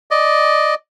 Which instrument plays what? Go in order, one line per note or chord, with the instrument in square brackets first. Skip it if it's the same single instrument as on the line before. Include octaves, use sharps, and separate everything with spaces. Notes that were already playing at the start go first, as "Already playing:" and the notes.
[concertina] D5 D#5